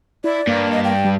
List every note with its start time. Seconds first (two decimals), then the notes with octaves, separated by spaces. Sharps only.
0.24 E4 D5
0.47 G2 A#3
0.72 D#5
0.84 G5
1.05 G3